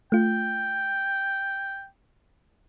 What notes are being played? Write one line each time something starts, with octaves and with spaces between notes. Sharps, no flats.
A3 F4 G5